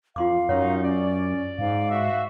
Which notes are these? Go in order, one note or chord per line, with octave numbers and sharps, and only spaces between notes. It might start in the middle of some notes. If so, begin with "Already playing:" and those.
F2 F4 F5 C6 D6
F#2 C#4 D#4 C#5 F#5 C6
C#4 D5
G#2 F5
F#4 E5